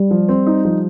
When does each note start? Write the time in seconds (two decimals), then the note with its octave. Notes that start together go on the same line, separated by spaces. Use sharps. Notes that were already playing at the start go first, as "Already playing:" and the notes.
Already playing: G3
0.11 F3
0.29 C4
0.47 D#4
0.65 F3